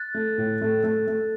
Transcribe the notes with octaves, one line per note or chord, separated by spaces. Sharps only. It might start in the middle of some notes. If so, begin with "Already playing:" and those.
Already playing: F#6 A6
A3
A2
A3
A3
A3